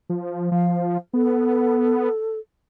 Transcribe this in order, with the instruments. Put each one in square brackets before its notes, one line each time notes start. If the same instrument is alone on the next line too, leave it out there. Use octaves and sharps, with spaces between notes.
[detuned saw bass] F3
[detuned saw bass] F3 [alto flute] F5
[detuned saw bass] B3 [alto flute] A4